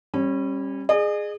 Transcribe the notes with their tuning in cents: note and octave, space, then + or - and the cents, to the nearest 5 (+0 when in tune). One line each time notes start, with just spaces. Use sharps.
G3 +10 C#4 -30
G#4 +0 D#5 -45